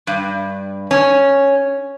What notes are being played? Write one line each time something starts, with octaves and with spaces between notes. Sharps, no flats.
G2
C#4